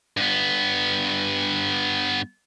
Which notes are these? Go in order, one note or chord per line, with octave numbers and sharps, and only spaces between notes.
G2 B3